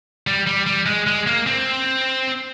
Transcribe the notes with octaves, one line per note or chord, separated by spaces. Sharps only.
G3
G3
G3
G#3
G#3
A#3
C4